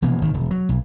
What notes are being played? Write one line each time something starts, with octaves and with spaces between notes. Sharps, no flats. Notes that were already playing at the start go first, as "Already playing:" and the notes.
F1 B2 E3 A#3
G#1 D#3
E1
F#3
B1